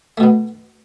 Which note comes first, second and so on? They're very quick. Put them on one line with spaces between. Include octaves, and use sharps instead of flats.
A3 B2 B3